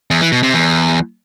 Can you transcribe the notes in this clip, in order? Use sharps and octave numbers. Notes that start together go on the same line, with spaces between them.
E2
E3
B2
C3
E2